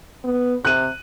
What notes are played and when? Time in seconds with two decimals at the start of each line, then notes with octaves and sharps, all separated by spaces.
0.25 B3
0.65 C3 F#6 D#7